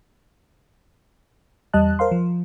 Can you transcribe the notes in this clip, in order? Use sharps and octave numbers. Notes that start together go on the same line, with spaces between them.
E2 G3 D#5 A5 F#6
A#4 C5 F5 C6
F3